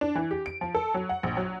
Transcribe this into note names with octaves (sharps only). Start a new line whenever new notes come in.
D4
E3
G4
D7
F3
A4
F#3
F#5
A#1
F#3